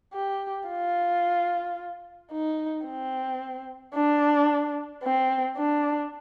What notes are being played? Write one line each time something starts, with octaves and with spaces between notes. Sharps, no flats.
G4
F4
D#4
C4
D4
C4
D4